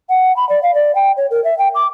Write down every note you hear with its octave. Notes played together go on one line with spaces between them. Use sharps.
F#5
B5
D5
F5
D5
G5
C#5
A#4
E5
G5
D6